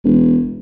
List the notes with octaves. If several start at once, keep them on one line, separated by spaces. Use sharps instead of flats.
E1